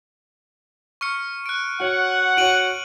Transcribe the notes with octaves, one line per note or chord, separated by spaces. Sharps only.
C#6 F6 C#7
F#6 D7
F#4 C#5 F#5
F#4 C#5 D7 D#7 F#7